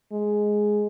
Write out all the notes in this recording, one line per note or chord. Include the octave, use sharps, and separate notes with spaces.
G#3